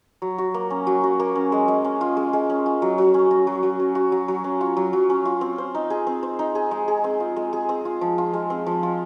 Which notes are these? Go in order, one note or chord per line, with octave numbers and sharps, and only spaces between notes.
F#3
F#4
A#3
C#4
F#3
F#4
A#3
C#4
G#3
G#3
C#4
F4
G#3
G#3
C#4
F4
F#3
F#3
C#4
F#4
F#3
F#3
C#4
F#4
F#3
F#3
C#4
F4
F#3
F#3
C#4
F4
C4
C5
D#4
G#4
C4
C5
D#4
G#4
G#3
G#4
C4
F4
G#3
G#4
C4
F4
F3
F4
G#3
C4
F3
F4